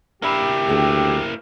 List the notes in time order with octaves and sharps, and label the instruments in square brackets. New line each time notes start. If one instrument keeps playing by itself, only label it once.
[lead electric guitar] A#3 E4 [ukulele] D4 B5 [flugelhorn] G4
[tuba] D2 [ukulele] D4 G#4 G5